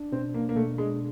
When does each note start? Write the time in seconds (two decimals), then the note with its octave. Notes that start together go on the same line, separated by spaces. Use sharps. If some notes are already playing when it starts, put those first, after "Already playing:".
Already playing: D4
0.12 B2 C4
0.34 A#3 D4
0.49 A#3
0.56 B2 A3
0.78 G#3 D4